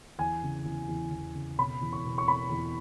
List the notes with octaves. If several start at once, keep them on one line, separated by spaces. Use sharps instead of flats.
E2 G#5
C#3
E2
E2
E2
C#3
B2 B5
E2
C#6
B2
C#6
B2 B5
E2